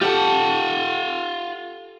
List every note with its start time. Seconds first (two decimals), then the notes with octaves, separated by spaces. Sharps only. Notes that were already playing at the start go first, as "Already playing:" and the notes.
0.01 F4 G4 A4 F#5